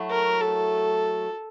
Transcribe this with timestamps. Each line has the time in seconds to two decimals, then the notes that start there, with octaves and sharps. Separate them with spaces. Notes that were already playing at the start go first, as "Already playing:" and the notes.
Already playing: F#3 A3 E4
0.11 A#4
0.41 A4